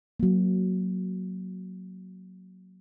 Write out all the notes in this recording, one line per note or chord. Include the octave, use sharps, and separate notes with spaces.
F#3 A#3